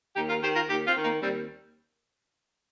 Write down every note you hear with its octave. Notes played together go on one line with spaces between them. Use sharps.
D#2 D#4 G4
F4 A#4
D#3 G4 C5
F4 A#4
D#2 D#4 G4
C4 F4
D#3
A#3 D#4
D#2 G3 C4